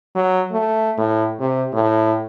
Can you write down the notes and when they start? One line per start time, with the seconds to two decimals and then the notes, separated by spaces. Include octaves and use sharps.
0.15 F#3
0.52 A3
0.98 A2
1.40 C3
1.73 A2